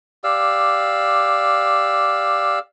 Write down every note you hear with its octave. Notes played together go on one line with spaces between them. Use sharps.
G4 D5 F5 E6